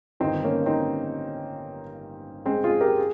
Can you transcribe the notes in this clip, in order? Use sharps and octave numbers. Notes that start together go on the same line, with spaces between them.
G1 G2 D#3 C4 D#4
A#3 C#4
C4 D#4
G#3 C4
F4 G#4
G4 A#4
G#4